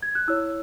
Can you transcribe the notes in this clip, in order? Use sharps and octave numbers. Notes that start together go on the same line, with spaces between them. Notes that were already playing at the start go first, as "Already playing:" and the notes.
G#6
F#6
E4 C#5 E6